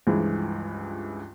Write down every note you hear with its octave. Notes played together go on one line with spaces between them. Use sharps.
C#2 G2 E3 F3 G#3